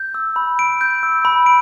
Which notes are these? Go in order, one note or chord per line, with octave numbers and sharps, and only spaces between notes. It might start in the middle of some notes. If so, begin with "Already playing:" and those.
Already playing: G6
E6
B5
D7
G6
E6
B5
D7